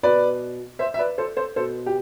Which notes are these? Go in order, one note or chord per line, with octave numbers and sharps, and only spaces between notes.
B2 B4 D5
C5 E5
E5
B4 D5
A4 C5
A4 C5
B2 A4 C5
G4